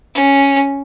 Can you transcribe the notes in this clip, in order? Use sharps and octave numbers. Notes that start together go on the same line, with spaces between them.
C#4